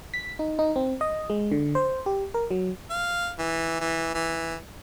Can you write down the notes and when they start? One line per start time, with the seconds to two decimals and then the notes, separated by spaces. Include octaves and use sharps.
0.14 B6
0.39 D#4
0.59 D#4
0.76 C4
1.01 D#5
1.30 G#3
1.51 D3
1.75 C5
2.06 G4
2.34 A#4
2.51 F#3
2.90 F5
3.39 E3
3.80 E3
4.15 E3